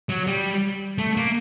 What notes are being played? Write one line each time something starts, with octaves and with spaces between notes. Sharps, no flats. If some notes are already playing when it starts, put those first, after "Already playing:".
F#3
G3
A3
A#3